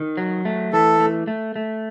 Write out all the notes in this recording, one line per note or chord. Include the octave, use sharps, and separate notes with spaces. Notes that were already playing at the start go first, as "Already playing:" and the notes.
Already playing: D#3
F#3
A3
E3 A4
A3
A3
A3